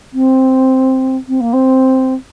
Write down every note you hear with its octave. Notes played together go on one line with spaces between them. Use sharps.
C4
C4
A#3
C4